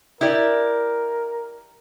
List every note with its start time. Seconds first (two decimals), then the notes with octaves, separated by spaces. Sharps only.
0.21 E4 G4 A#4 D5